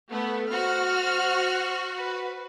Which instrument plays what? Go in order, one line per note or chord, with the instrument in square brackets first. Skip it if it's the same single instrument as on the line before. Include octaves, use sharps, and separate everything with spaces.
[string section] A3 B3
[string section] F#4 C5 [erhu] F6
[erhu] B4